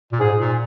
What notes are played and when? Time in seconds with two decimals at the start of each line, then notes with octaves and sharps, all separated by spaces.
0.12 A#2
0.20 G#2 G#4
0.39 A#2